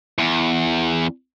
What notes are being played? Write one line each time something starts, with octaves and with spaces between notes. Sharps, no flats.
E2